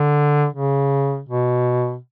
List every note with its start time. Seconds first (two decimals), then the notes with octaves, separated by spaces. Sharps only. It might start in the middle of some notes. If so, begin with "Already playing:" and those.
Already playing: D3
0.53 C#3
1.29 B2